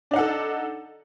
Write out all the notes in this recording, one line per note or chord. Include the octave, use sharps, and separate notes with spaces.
D4 D#4 A4 F#5